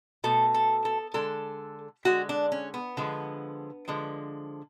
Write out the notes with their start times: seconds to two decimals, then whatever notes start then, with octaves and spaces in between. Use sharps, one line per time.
0.24 B2 A3 A4
0.54 A4
0.85 A4
1.14 D3 G#3 A4
2.05 D3 G#3 F#4
2.29 D4
2.52 C#4
2.74 B3
2.97 D3 F3 G#3
3.88 D3 F3 G#3